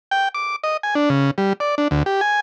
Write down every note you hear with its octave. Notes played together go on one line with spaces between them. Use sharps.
G5
D6
D#5
G#5
D4
C#3
G3
D5
D4
D2
G4
G#5